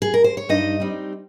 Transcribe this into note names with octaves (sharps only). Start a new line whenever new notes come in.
G#4
A#4
C5
C#5
G2 D#4 D#5
G3 C4 D#4